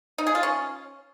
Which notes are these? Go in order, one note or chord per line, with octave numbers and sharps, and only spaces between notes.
D#4
G#4
F4
C#4